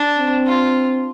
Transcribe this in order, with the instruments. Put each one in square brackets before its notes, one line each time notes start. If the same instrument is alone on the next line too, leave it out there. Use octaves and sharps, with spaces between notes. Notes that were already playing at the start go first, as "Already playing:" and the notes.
Already playing: [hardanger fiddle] D4
[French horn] C4
[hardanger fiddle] F4